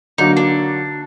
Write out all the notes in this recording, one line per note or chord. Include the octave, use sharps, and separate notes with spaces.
D3 F#3 A#3 D#4
D4